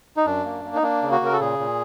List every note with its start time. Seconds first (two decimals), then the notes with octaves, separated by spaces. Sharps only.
0.17 D#4
0.26 F#2 D4
0.45 A#3
0.65 A#3
0.75 D#4
0.83 A#3 D4
1.03 C#3
1.12 F#4
1.21 C#3 A#4
1.33 A4
1.40 A#2 G#4
1.59 A#2